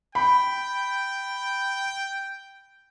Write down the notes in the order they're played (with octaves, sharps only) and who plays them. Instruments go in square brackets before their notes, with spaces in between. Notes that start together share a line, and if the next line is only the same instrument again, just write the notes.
[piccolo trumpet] G5 [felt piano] B5